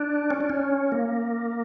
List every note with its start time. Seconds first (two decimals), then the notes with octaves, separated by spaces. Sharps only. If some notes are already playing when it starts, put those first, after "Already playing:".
Already playing: D4
0.31 C#4
0.41 D4
0.50 C#4
0.92 A#3